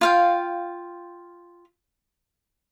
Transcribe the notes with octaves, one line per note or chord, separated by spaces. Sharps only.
F4 F5 G5